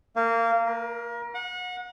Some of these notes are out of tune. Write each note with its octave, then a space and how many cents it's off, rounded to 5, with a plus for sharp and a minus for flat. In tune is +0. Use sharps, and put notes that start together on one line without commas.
A#3 -20
A#4 +30
F#5 -30